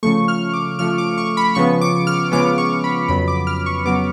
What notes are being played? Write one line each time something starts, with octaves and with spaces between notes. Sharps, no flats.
C#3 F3 A3 C#6
F6
D6
C#3 F3 A3 F6
D6
C#6
B5
C#3 F3 G#3 B3 C#6
D6
F6
C#3 F3 G#3 B3 D6
C#6
B5
F2 C#3 F#3 B3 B5
D6
F6
C#6
C#3 F#3 B3 D6